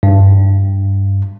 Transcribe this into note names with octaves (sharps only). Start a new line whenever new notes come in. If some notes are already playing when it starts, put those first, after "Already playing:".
G2